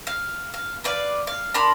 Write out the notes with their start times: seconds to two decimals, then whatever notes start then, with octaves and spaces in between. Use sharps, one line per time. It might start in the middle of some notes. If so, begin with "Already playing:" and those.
0.07 F5
0.54 F5
0.84 B4 D5 F5
1.27 F5
1.54 D4 A#4 B5 C6